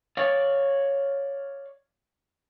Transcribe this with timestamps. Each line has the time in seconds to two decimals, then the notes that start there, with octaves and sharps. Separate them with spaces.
0.17 C#5 D5 F5